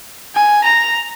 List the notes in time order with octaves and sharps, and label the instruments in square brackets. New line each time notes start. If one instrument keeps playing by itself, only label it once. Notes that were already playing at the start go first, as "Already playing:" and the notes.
[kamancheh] G#5
A#5